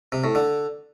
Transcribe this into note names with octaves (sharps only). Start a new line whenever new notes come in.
C3
A2
D3